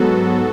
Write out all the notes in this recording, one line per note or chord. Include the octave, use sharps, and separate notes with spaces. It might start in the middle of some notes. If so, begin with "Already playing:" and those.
Already playing: G#2 F#3 B3 F#4 A4